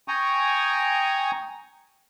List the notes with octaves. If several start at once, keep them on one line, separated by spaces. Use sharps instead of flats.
G5 G#5 A#5 C#6 D#6